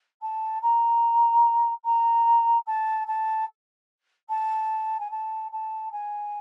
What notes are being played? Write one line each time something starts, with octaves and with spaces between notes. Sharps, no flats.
A5
A#5
A#5
A5
A5
A5
G#5
A5
A5
G#5